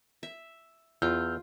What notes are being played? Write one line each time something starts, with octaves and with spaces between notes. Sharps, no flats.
E5
E2 F4 E6 F6 G6